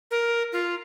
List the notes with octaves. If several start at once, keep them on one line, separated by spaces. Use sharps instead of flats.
A#4
F4